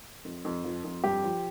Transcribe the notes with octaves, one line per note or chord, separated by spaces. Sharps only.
F2
F2
F3
F2
G2 G4
F3